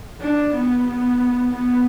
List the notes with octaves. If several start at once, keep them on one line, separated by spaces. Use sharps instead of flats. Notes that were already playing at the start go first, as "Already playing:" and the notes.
D4
B3
B3
B3